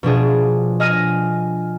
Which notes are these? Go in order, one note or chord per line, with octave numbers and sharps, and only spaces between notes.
B2 F3 D4 G#4
D#5 G#5 F6 A#6 D#7